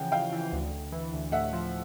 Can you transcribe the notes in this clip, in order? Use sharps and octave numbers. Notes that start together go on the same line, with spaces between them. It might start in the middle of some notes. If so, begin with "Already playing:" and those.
Already playing: C#3 E3 F3 F#5 G5
C#3 F5 G5
E3
D2
D2
E3
D2
A2 E5 F#5
F3